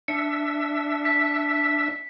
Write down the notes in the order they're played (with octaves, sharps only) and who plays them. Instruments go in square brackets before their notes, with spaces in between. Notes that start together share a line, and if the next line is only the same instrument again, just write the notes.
[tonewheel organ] D4 E5 [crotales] C#7
[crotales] B6